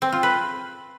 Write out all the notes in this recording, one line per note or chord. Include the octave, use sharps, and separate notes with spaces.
C4
F4
B4